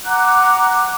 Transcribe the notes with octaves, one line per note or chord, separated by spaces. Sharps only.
F#5 A#5 D6 F#6